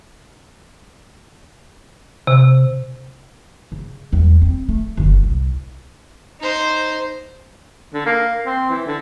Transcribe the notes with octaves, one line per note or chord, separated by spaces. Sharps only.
C3
C#3
E2 G3
C4
A3
F#1 D3
C2
D#4 C5
D3
A#3
C4
E3
D3